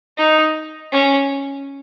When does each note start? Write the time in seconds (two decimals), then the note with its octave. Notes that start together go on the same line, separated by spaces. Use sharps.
0.17 D#4
0.92 C#4